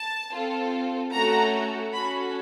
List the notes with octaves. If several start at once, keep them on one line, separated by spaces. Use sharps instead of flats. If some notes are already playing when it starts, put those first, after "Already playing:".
Already playing: A5
C4 F4 A4
A3 C#4 F#4 A4 A#5
C#4 F#4 A4 B5